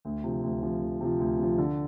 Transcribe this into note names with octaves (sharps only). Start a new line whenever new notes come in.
D2
C3 F3
D2
C3 F3
D2
C3 F3
D2
C3 F3
D3